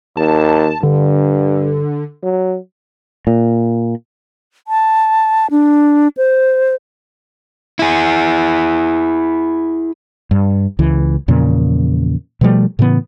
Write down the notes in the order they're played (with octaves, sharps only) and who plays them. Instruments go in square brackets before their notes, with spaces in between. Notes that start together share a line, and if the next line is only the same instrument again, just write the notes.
[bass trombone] D#2 [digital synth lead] A5
[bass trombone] G2 [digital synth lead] D3
[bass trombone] F#3
[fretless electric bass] A#2
[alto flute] A5
D4
C5
[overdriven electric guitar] E4 G#4
[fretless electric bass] G2
C#2 E3
E2 A#2 C#3 F3
B2 F3 G3 A3
A2 C#3 E3 B3